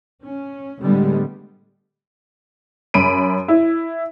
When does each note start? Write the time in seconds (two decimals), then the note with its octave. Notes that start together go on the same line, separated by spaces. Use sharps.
0.24 C#4
0.80 A2 D3 G3 G#3 B3
2.94 F#2 B5 D7 D#7
3.48 E4